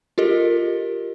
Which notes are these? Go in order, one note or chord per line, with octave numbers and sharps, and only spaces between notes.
F4 G4 A4 A#4 D#5